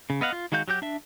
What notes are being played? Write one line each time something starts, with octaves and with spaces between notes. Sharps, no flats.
C#3
B3 D#5 F5 F#5
F4
D#3 G#3 F#4 F5 G6
F#3 F#4 G4 G6
D4 E5